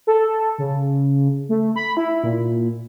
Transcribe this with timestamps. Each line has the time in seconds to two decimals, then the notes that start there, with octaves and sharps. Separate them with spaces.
0.07 A4
0.58 C#3
1.49 A3
1.76 B5
1.97 E4
2.24 A#2